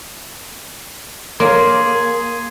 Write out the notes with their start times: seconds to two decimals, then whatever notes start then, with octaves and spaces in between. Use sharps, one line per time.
1.40 A#3 G#4 C#5 C6